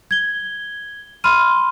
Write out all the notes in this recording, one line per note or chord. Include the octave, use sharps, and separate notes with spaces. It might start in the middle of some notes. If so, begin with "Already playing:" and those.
G#6 G7
B5 C6 F6 D#7